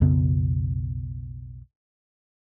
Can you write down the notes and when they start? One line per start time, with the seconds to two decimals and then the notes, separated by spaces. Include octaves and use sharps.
0.01 B1 F2 C#3 B3